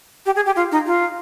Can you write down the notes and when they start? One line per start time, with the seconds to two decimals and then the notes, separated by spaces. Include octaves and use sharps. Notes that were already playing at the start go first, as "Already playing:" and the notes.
0.26 G4
0.36 G#4
0.46 G4
0.56 F4
0.71 D#4
0.86 F4